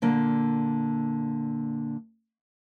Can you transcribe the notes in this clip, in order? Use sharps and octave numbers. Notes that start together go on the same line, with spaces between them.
A#2 D3 A#3